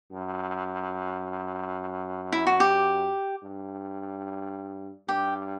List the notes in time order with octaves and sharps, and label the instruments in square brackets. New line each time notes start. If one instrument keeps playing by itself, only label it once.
[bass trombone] F#2
[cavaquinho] E4
F#4
G4
[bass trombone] G2
[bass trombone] G2 [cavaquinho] G4